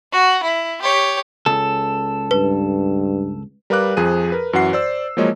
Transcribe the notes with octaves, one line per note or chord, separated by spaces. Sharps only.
F#4
E4
G4 C#5
C#2 A4
G2 B4
G3 A#4 B4 F5 D6 F#6
F2 F3 G#4 D#7
A#4 B4
F#2 E3 F#4 F#5 C7
C5 D5 E6
F3 F#3 G#3 A#3 C#5 D#5